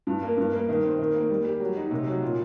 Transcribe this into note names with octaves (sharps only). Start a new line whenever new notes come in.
G2
A#3
G2
A#3
D#3
C4
D#3
A#3
G3
G4
F#3
D#4
C3
F#3
A#2